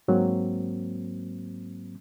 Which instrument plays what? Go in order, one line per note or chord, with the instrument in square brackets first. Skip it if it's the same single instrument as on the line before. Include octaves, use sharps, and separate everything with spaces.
[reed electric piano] G#2 F#3 A#3 C4